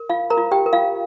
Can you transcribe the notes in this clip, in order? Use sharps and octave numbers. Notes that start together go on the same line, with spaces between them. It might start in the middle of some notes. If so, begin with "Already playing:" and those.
Already playing: A#4
F4 F5
A#4 A#5
F4
G4 G5
A#4
F4 F5